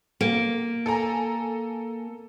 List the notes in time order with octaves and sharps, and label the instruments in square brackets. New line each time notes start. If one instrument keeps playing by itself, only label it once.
[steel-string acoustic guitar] A#3
[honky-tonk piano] A4 G#5 A#5